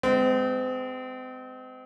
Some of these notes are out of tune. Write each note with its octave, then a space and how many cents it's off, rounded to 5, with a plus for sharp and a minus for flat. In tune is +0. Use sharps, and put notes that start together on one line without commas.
G#3 +0 C4 -35